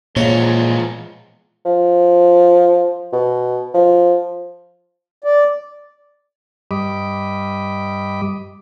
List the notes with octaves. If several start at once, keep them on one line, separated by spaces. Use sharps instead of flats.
E2 A#2 F3 G#3 C#5
F3
B2
F3
D5
G2 G3 D#5 B5 D6